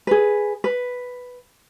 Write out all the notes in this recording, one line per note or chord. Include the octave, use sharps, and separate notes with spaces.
G#4 B4
B4